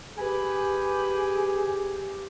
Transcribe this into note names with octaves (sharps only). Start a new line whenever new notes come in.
G4 G#4 B4 G#5